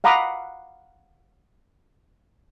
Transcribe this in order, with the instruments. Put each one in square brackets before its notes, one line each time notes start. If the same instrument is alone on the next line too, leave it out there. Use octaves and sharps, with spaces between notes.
[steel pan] F5 F#5 A#5 B5 D6 D#6